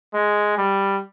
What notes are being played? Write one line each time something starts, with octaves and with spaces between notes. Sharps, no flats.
G#3
G3